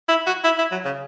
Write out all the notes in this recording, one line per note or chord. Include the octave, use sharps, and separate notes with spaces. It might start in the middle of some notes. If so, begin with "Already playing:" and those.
E4
F#4
E4
E4
F#3
C#3